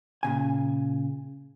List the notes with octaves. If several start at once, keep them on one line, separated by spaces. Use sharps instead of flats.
A#2 C#3 G#5